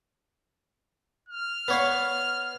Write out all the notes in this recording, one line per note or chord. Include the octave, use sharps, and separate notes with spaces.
F6
B3 C#5 F5